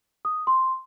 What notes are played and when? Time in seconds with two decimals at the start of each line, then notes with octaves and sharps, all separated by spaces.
0.25 D#6
0.47 C6